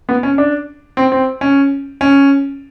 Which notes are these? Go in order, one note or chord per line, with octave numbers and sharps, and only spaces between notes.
B3
C#4
D4
C4
C4
C#4
C#4